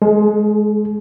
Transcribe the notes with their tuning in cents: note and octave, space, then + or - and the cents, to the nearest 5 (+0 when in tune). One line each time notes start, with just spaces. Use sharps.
G#3 +15 A4 -45